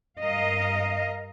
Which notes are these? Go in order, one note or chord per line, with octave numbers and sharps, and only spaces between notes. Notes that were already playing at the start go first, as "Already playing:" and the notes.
G2 A#4 D#5 F5